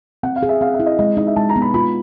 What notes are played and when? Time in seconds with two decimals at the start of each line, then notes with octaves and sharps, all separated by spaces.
0.23 C4 F#5
0.36 F5
0.43 G#4
0.49 E5
0.61 C4 F5
0.74 E5
0.80 E4
0.86 D#5
0.98 G#3 D#5
1.17 D#4 D#5
1.27 E5
1.36 G#3 A5
1.49 A#5
1.56 B3
1.62 B5
1.74 F4 B5